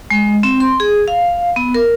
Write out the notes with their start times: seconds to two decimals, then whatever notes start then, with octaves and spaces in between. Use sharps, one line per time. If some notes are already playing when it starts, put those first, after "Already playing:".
0.10 G#3
0.43 C4
0.60 C6
0.80 G#4
1.08 F5
1.56 B3
1.74 A#4